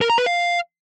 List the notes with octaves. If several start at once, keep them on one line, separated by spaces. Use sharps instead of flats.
A#4
A#5
B4
F5